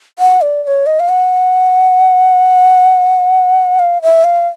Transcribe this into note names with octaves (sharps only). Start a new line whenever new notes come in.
F#5
D5
D5
C#5
D#5
F5
F#5
F5
E5
F5